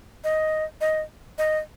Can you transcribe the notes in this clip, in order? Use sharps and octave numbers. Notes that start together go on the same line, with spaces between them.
D#5
D#5
D#5